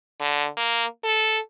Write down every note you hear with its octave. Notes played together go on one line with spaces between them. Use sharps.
D3
A#3
A4